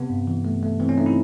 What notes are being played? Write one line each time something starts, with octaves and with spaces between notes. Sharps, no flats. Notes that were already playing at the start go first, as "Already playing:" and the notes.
Already playing: C3 B3
G2
E3
A3
A3
E3 C4
C#4
A3 D#4
E4